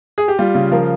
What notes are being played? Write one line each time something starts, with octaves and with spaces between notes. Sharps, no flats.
G#4
G4
G3 F4
C#3
F3 A#4